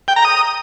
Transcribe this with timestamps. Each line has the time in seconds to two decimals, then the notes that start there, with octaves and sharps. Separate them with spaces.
0.08 G5
0.16 A#5
0.25 D#6